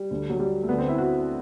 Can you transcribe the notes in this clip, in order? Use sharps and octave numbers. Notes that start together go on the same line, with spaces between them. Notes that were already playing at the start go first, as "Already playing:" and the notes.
Already playing: G3
D2 D3
F#3
G3
A3
D2 D3 B3
C4
E4
F#4